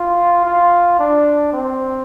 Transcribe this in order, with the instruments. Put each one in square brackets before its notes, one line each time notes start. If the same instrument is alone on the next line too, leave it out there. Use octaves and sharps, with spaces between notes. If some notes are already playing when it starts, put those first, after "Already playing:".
Already playing: [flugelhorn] F4
F4
D4
C4